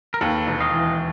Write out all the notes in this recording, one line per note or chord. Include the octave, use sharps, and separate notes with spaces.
A#4
D#2 A4 B4
E1
D#5 F5
E3